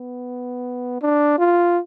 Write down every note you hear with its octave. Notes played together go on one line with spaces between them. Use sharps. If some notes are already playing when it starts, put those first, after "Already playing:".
Already playing: B3
D4
F4